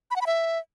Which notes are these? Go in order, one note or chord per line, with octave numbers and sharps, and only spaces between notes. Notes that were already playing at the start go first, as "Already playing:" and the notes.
B5
F#5
B5
E5